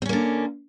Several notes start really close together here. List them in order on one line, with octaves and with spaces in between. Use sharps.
C4 C#4 A#3 D3